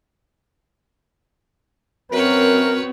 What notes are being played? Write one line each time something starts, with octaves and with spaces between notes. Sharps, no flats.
F#2 C4 F#4 A#4 B4 C#5